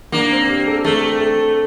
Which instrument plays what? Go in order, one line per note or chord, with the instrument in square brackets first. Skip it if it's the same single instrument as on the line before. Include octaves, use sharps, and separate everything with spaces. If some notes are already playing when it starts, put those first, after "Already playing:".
[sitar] A#3 [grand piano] D4
[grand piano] C4
G4
A4
[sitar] A3 [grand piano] A4
[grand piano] A4